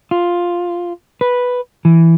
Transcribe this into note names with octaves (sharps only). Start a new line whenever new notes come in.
F4
B4
E3